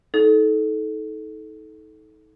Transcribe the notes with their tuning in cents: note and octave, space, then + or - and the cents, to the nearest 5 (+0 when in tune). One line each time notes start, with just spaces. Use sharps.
D#4 +35 A4 -20